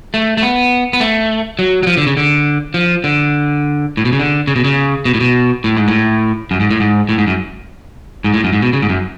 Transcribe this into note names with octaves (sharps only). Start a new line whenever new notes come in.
A3
A3
B3
B3
A3
F#3
F#3
F3
D3
C#3
D3
F3
D3
A2
B2
C#3
D3
C#3
B2
C#3
B2
A2
B2
A2
G#2
A2
F#2
G#2
A2
G#2
A2
G#2
F#2
G#2
A2
F#2
G#2
B2
C#3
G#2
F#2